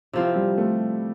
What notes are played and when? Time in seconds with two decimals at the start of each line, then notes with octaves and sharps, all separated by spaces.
0.13 C3 F3 C4 E4
0.36 G3
0.58 A3